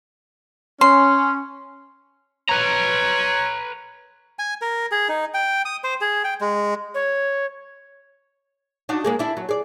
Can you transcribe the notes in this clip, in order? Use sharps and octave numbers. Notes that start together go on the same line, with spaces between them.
C#4 C6
B4 C#5 A#5
G#5
A#4
G#4
D#4
G5
D#6
C5
G#4
G5
G#3
C#5
D4 D#4 F#4
G#3 A#3 G#4
D4 E4
F#3
G#4 D5